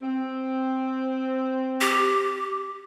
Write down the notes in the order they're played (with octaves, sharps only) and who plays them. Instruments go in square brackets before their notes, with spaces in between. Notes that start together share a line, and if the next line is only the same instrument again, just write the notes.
[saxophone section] C4
[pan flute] G4